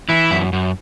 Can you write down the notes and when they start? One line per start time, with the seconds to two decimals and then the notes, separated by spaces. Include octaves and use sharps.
0.09 E3 E4
0.31 F#2
0.53 F#2